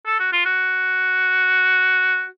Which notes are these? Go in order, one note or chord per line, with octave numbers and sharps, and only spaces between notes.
A4
F#4
F4
F#4